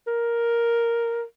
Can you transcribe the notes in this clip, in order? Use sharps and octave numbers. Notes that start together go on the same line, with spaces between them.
A#4